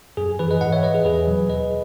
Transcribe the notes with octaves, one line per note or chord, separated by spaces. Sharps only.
F#2 G#4
E3 G#4 B4
B4 D#5
G#2 D#5 F#5
C#5 E5
E3 B4 D#5
G#4 B4
E2 G#4 B4
B2 F#3
D#2 B4 D#5